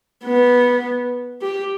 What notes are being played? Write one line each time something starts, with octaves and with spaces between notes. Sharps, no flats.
B3
G4